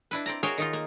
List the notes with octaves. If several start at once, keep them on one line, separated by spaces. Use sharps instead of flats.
D4 E4 B4
C4 D5 A#5
F#4 G#4 A#4 C#5 F5 G5
D#3 D#4 F4
A#3